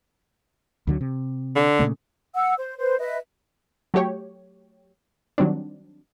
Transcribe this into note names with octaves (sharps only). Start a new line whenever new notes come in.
D2 D3 F#3
C3
D3
A#2 C#3 A3
F#5 E6
C5
B4 C5
B4 D#5 E5
F#3 A3 G4 C#5
D#3 F#3 G3 C4 D4